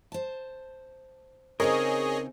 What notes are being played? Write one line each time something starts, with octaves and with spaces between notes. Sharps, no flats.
C5 A5
C#3 C4 D#4 G#4 A#4 C#5 D#5